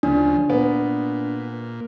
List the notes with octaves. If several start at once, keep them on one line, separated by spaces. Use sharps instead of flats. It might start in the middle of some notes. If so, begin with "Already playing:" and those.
D2 C#3 F3 D4
A#2 B3